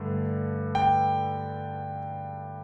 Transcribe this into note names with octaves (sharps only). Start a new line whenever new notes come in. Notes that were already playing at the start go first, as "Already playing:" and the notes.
Already playing: G2 D3 A3
G5